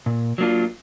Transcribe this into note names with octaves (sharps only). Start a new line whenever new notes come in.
A#2
F#3 A#3 D4 F4